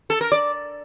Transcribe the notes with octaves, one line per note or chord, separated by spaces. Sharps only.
A4
A#4
D5